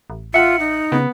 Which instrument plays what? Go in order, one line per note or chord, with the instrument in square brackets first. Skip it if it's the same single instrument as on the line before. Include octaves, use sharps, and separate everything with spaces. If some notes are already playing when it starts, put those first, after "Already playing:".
[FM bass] A1
[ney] F4 [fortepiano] E5 F#5 [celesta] C#7
[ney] D#4
[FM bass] C#3 [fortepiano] B3